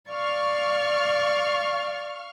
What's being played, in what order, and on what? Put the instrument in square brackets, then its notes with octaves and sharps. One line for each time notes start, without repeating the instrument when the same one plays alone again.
[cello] D5 [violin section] F5 C#6 F6